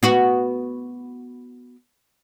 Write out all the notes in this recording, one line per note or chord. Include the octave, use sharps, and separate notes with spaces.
B3 F#4